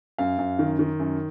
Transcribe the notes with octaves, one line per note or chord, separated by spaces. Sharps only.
F#2 F5
F#2
D#3
D#3
F#2